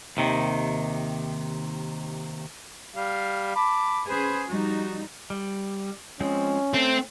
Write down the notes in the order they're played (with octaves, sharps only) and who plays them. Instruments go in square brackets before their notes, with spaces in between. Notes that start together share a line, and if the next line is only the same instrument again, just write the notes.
[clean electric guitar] D#2 C3 D#3
[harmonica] G3 F5
A5 B5 D6
[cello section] C#4 G#4 [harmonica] B4 C5
[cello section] F3 G3 D#4 [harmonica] F#4
[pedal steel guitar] G3
[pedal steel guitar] F3 G#3 C4 [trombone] C#4
[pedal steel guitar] A3 [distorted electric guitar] C4